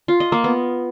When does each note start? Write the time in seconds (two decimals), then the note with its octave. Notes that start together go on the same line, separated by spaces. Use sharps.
0.08 F4
0.20 D#5
0.32 A#3
0.44 B3